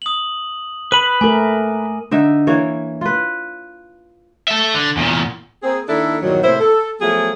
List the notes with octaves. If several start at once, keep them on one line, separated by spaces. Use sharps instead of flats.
D#6 F#7
B4 B5 D#7
A3 A#4 G#5 D6
D3 D#4 E5
E3 A#3 C#5
F4 B4
A4 E5
D3
E2 A#2
A#3 C4 G#4
D#3 A#3 D4 E4 A4
E2 G2 A#2 D#3 F#3
A2 C3 A#3 E4 C5
A4
F3 F#3 A3 B3 F4 G#4